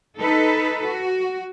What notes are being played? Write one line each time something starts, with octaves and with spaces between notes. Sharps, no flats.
D#4 A4 B4
F#4